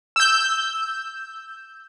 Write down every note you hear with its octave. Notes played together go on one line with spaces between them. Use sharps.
E6 G6